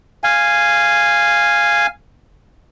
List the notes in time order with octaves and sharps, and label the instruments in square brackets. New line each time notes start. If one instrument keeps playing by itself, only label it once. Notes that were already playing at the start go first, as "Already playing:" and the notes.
[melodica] F5 G#5